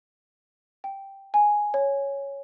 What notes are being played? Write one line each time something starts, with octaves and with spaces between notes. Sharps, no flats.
G5
G#5
C#5